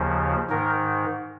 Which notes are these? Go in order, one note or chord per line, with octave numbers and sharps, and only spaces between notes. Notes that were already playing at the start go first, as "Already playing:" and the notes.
Already playing: D#2 C#3 F3
G#2 D#3 A#4